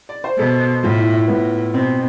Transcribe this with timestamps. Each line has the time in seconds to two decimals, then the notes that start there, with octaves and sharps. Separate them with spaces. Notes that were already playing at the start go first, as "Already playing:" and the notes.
0.09 D5
0.24 C5
0.38 B2 A4
0.84 A2 F4
0.98 E4
1.13 E4
1.28 A2 B3
1.74 B2 C4